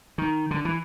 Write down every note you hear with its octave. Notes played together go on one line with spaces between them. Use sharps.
D#3
D3
E3